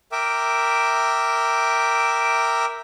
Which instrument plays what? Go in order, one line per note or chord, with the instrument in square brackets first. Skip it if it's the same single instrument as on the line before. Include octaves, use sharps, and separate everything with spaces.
[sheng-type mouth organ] A#4 E5 G5 D6